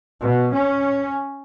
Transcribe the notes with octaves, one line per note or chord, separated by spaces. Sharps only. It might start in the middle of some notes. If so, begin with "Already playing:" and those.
B2
C#4